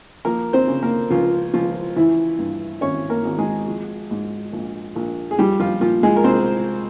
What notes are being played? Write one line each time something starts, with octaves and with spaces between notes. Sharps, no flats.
F3 A#3 A#4
C4 C5
C#3
A#3 A#4
C#2 F3 F4
C#2 F3 F4
E3 F3 E4
G2
G#1 C#4 C#5
A#3 A#4
G#1
G#3 G#4
F3
G#2
A#1
A#1
G#4
F3 G3 G4
F3 F4
A#2 F3 F4
G#3 G#4
A#4
C2 C4 C5